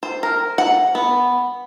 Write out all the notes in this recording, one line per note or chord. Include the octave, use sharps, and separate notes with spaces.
C5
A#4
F#5
B3